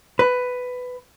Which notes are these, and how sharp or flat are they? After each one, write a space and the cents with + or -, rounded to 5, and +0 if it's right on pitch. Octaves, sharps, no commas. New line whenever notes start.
B4 +10